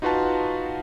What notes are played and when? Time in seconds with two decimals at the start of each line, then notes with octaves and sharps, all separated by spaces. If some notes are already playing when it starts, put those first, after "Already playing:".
0.02 D#4 F4 F#4 B4 F5 A5